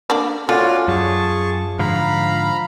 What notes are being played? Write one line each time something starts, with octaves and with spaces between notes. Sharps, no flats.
A#3 D4 D5
A3 C#4 F4 F#4 D5
F#2 G#4 A5 C#6
G#2 D3 F3 F5 A#5 B5